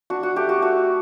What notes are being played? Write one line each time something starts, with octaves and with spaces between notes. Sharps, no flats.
D4 F#4
F#4
A3 G4
F#4
A3 F#4